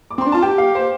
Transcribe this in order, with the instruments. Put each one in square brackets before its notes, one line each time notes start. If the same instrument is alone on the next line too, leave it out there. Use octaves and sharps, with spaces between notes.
[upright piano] D6
[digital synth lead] C4 [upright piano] C6
[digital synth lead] D4
[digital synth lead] F4 [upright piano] A5
[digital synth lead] G4 [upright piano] G5
[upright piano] F5
C5